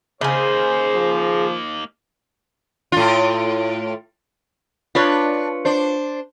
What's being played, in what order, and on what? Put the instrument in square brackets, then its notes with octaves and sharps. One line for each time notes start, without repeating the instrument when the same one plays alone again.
[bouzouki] C#3 G#4 [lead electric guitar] A#3 D#4 [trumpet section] C5
[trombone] F3
[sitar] A2 F4
[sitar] D4 [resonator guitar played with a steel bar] F4 B4 C#5
[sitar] D4 C5